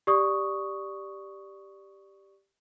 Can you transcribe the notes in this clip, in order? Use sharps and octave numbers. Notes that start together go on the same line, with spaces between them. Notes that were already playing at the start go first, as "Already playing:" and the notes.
G4 D5 C#6 D#6